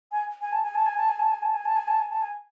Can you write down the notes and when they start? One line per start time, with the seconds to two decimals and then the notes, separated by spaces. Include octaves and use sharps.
0.12 G#5
0.41 G#5
0.52 A5
0.63 G#5
0.75 A5
0.86 G#5
0.97 A5
1.09 G#5
1.19 A5
1.31 G#5
1.42 A5
1.54 G#5
1.65 A5
1.76 G#5
1.88 A5
1.99 G#5
2.10 A5
2.22 G#5